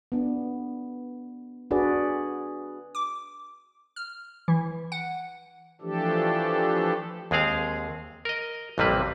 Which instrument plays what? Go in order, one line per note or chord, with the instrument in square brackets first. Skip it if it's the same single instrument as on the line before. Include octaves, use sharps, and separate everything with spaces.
[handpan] B3 D4
D4 F#4 G#4 B4 D5
[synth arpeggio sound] D6
F6
E3
F#5
[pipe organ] E3 F3 A3 D4 G4 A4
[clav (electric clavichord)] D#2 G#3 C4 G#4 F5
A#4 D#5
A1 F2 C3 G3 A#3 B4